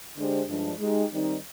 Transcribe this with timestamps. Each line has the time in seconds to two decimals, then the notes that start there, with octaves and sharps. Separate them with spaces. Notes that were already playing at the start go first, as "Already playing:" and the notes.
0.17 D3 G#3 D4 G4 C5
0.48 G2 F3 G#3 D4
0.79 G#3 D#4 G4
1.12 D#3 G3 C4 D#4